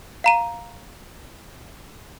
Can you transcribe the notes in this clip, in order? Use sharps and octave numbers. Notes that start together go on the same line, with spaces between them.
F5 A#5 D#7